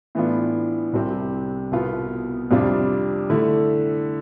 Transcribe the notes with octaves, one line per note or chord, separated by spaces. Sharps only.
A2 E3 B3 D4 F4
C2 C3 G3 C4
C2 B2 B3 F4
F2 C3 G3 D4 F4
D3 A3 E4